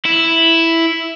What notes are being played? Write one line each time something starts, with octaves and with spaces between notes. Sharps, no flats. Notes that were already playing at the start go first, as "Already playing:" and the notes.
E4